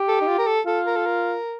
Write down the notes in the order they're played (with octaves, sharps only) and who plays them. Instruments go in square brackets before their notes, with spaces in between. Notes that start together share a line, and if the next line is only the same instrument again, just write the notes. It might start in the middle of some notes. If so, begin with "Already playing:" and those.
Already playing: [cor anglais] G4
[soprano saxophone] A4
D#4
F4
A#4
A4
[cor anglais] F4 [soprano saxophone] A4
[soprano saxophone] A#4
A4
A#4